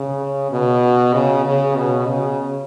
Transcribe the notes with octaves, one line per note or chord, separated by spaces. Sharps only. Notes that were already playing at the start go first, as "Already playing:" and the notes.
Already playing: C#3
B2
C#3
C#3
B2
C#3